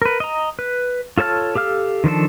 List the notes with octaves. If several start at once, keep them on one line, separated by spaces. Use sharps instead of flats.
A#4 B4
D#5 A#5
B4
F4 A4 C#5 A5 F6
G4 A4 F5 F6
D#3 F3 D4 A4